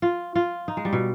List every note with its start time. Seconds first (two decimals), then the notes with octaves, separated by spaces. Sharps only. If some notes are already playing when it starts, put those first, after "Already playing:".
0.02 F4
0.35 F4
0.68 D#4
0.77 G#3
0.85 G3
0.93 B2